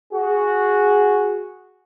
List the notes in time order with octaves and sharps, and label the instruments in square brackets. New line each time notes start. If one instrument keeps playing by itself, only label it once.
[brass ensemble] F#4 G#4